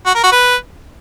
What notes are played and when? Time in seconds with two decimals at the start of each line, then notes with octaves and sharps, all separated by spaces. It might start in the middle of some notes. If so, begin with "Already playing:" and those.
0.06 F#4
0.15 A#4
0.23 F#4
0.32 B4